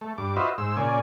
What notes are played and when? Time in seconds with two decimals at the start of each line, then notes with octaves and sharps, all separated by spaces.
0.01 A3
0.18 G2 D6
0.36 F4 F#4 B4 C5 D#5 E5
0.58 G#2 C5 E6
0.77 A#2 C#3 D5 G#5